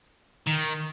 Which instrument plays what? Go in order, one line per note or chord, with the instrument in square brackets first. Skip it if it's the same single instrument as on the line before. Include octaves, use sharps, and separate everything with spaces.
[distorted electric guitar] D#3